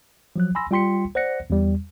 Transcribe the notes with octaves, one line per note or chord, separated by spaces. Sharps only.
F3 F#3 F#6
G#5 B5 C6 E6 A#6
G3 F4 G5 C6 B6 C#7
C5 D5 F#5 F#6 A#6 C#7
E2 G3